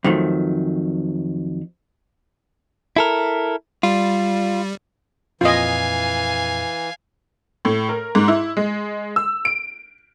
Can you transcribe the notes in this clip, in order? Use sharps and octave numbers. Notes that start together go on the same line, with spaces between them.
F2 D#3 F#3 A3
E4 A4 A#4
G3 F4
F2 A#2 E3 F4 D#5 F5 G#5
A2
A#4
G#2
E4
G#3
E6
D7